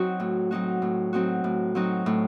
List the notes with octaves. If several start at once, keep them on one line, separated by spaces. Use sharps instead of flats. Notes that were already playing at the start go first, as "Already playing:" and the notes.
Already playing: F#3 C4 D#4 F#4
A2
F#3 C4 D#4 F#4
A2
F#3 C4 D#4 F#4
A2
F#3 C4 D#4 F#4
A2